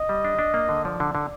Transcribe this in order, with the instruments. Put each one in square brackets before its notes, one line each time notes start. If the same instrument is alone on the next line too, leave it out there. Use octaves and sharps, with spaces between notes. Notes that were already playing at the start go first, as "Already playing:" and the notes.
Already playing: [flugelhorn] D#5
[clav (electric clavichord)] G3
D4
D4
A#3
D3
[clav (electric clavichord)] F3 [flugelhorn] D5
[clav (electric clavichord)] D3
D3